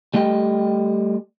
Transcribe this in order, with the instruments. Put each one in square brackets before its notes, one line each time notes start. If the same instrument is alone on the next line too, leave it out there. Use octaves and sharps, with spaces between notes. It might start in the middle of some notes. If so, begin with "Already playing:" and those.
[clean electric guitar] G3 A3 G4 D#5 F#5 G5